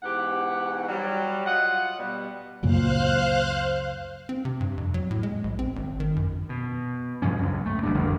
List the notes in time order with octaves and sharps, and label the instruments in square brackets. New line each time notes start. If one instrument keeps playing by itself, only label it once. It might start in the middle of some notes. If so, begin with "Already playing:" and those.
[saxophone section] E2 G#2 G4 F#5
F#3 G3
F4 D#5 F#5
B2 G3
[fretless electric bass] C#2 F#2 A#2 [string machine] C5 F5 F#6
[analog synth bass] C4
C3
G2
F2
F#3
A2
G#3
A#1
C4
G#1
D#3
F#2
[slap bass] B2
G2 B2 F3 C#4
C#2 F#2
A3
F#1 G#2 G3 D4
E1 F2 D3